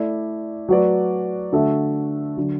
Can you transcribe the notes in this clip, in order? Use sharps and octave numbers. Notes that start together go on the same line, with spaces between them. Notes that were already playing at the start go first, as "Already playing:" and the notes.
Already playing: A3 E4 A4 D5
F#3 A3 F#4 B4 D5
D3 A3 F#4 A4 E5
D3 F#3